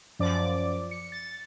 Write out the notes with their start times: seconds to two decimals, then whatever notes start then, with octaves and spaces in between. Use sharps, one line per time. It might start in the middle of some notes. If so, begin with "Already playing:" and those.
0.19 F#2 F3 D5 D6
0.91 C#7
1.12 A6